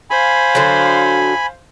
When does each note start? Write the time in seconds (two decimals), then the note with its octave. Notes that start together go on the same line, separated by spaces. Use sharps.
0.10 C5 F5 G#5 B5
0.55 D3 F#3